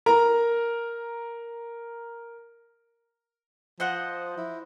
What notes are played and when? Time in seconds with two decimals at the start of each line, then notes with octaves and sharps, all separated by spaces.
0.06 A#4 A#5
3.80 F3 C5 D#5 F#5
4.37 E4